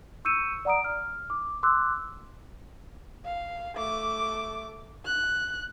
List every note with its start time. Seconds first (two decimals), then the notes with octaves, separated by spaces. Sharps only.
0.25 C#6 E6 G6 C#7 D#7 E7
0.65 D5 F#5 A#5 D#6 D7
0.84 F6
1.30 D6
1.63 C6 D6 E6 F#6
3.24 F5
3.75 A3 D6
5.05 F#6